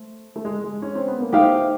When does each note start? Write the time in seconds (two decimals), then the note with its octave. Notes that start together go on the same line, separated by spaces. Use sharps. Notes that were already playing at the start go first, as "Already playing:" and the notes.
Already playing: A3 C5
0.36 A3
0.45 G#3
0.64 G#3
0.82 C#4
0.95 C4
1.08 B3
1.21 A#3
1.33 A3 D#4 G4 C5 F5